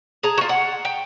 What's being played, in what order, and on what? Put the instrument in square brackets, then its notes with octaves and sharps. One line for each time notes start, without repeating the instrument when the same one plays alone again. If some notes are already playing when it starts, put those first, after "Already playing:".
[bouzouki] G#4 A5 A#5
F4 F#4
F#5
G5